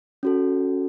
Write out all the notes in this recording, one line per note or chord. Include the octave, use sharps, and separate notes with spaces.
C#4 F#4 A4